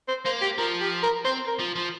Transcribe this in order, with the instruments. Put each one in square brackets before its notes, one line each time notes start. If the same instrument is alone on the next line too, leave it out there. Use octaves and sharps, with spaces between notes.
[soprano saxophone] C5
[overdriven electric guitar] A#3 [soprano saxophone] C5
[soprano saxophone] G4
[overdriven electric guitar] F3 [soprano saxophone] A#4
[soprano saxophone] G4
A#4
[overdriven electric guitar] C4 [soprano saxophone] C5
[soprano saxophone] A#4
[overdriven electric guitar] F3
F3